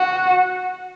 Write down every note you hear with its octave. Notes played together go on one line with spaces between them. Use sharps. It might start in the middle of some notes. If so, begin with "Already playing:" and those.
Already playing: F#4